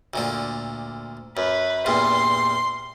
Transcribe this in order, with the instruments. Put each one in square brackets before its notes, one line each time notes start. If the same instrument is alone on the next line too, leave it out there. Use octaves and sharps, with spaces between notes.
[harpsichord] D2 A#2 D3
[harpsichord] F#2 [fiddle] B4
[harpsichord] E2 G2 A#2 [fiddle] C6